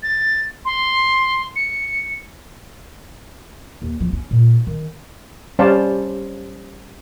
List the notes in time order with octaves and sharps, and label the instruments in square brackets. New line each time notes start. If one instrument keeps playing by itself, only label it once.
[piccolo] A6
C6
C#7
[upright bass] D#2
F3
C#4
A#2
D#3
[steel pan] G3 C#4 C5 D5 F5 A5